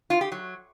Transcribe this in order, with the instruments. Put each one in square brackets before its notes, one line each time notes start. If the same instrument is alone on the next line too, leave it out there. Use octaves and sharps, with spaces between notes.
[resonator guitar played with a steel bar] F4
G4
F#3